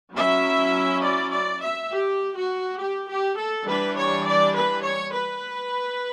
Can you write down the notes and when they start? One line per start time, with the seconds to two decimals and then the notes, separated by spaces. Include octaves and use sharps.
0.14 F#3 C#4 E4 E5
1.02 D5
1.31 D5
1.60 E5
1.90 G4
2.32 F#4
2.76 G4
3.06 G4
3.35 A4
3.64 E3 G3 D4 B4
3.94 C#5
4.23 D5
4.53 B4
4.81 C#5
5.11 B4